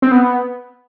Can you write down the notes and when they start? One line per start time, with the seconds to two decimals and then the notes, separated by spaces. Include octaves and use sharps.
0.02 C4
0.11 B3